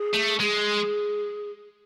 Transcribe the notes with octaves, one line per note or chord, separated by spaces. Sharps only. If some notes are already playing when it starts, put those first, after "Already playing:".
Already playing: G#4
A3
G#3 G#4